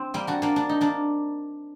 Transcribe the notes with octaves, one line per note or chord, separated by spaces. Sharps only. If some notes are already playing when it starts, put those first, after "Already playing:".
Already playing: C4 D4
G3 A#3
D4 F#4
A#3 D4
D4
D#4
A#3 D4